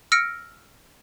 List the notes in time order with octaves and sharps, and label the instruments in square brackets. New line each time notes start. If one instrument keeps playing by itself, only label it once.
[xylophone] E6 F6 A#6 C#7 D7